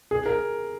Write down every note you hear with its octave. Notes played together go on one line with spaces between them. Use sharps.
G#4
A#4